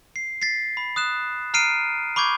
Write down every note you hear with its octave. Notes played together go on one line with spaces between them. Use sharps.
C7
A6 B6 C7
B5
D#6 F#6 E7
A#5 F6 C7 D7 D#7
B5 C#6 D6 G6 G#6